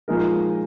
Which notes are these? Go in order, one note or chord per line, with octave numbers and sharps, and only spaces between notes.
A#2 F3 G#3 D#4 A#4